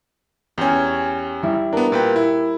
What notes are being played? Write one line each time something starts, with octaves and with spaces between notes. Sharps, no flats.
E2 C#4 G4 G#5
G3 E4
B3 D4 A#4
A#2 B4 G5
E4